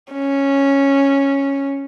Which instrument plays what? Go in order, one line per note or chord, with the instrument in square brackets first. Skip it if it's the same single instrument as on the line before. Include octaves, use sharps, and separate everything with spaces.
[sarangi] C#4